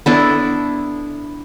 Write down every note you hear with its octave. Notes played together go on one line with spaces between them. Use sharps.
B3 D4 E4 A4